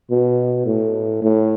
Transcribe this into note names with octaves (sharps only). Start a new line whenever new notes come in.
B2
A2
A2